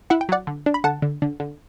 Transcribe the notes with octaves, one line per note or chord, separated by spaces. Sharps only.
E4 F#5
G5
F#3 D5 F#5
D3
D4
B5
D3 F#5 A5
D3
D3
D3